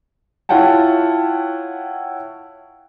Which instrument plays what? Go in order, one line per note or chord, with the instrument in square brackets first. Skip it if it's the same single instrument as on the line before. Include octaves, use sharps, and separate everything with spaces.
[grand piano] E4 F4 C#5 F#5 G5 A5